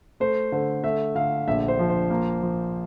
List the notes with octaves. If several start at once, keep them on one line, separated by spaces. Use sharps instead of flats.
A3 C5
D3 C5
A3 E5
D3 F5
A#1 E5
C5
F3
C5
A#3
F3